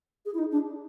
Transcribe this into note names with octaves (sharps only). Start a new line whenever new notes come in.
G#4
E4
D#4
D4